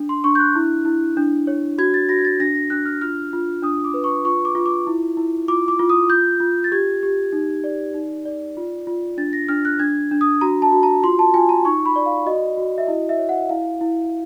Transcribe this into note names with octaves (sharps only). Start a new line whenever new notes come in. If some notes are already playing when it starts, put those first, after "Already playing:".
Already playing: D4
C6
D4 C#6
G6
F#6
E4
E4
D4
C#5
F#4 G#6
A6
F#4 A#6
G#6
A6
D4 A#6
A#6
D4 F#6
F6
F4 F6
F4
D4 D#6
D6
B4
C#6
F4 C#6
D6
F4
D6
E4
E4
F4 D6
D6
F4
D#6
F4 G6
F4
A6
G4 G#6
G4
D#4
D5
D#4
D5
F4
F4
D4 A6
A#6
D4 F6
F#6
D4 G#6
D4
D#6
F#4 A#5
A5
F#4
A#5
F4 C6
A5
F4 G#5
A#5
D#4 C#6
B5
D5
F5
F#4 D#5
F#4
E5
E4 D#5
E5
C#5
F#5
E4 F5
E4